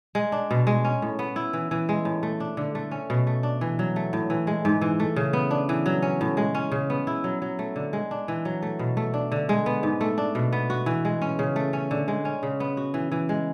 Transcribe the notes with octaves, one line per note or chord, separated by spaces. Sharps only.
G#3
D4
B2
G#3
C#4
A2
B3
E4
E3
E3
G#3
A2
A3
D4
D3
A3
C#4
B2
A3
D4
E3
F#3
A3
A2
E3
G#3
G#2
E3
A3
C#3
B3
D4
E3
F#3
C#4
A2
G#3
C#4
C#3
B3
E4
F#3
F#3
A3
D3
G#3
D4
E3
F#3
A3
B2
A3
D4
D3
G#3
B3
G#2
A3
D4
B2
B3
F#4
E3
G#3
C#4
C#3
A3
C#4
D3
G#3
C#4
C#3
B3
F#4
E3
E3
G#3